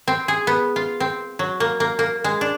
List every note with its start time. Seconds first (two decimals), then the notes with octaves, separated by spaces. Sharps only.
0.08 C4
0.28 G#4
0.47 B3
0.76 F4
1.00 C4
1.39 F#3
1.60 A#3
1.80 A#3
1.99 A#3
2.24 G#3
2.41 D4